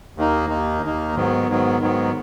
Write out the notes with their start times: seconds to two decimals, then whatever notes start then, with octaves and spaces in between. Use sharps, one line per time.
0.17 D#2 D#3 A#3 D#4
0.49 D#2 D#3 A#3 D#4
0.82 D#2 D#3 A#3 D#4
1.16 G#2 D#3 F#3 B3
1.49 G#2 D#3 F#3 B3
1.81 G#2 D#3 F#3 B3